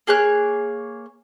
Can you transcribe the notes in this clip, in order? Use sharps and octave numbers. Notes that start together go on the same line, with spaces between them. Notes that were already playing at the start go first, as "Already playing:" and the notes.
A#3 G#4 C#5 F#6